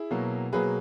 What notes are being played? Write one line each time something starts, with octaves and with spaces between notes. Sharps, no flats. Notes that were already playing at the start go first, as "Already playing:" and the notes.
Already playing: E4 G#4
B2 F#3 A#3
B2 F#3 A#3 G#4 B4